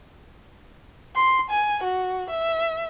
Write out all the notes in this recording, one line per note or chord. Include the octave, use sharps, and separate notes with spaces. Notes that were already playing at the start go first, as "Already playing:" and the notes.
C6
G#5
F#4
E5